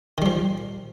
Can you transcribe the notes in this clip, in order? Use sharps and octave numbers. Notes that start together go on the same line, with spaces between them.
D#3 F3 G3